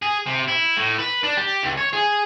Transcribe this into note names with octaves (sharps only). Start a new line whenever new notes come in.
G#4
C3
E4
A2
B4
D4
G4
C#2
C#5
G#4